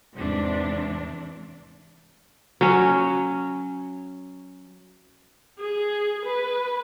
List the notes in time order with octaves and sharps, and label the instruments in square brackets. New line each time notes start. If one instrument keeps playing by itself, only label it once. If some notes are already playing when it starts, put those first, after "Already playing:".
[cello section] E2 G#2 C3 E3 D4
[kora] F#3 C#4
[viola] G#4
B4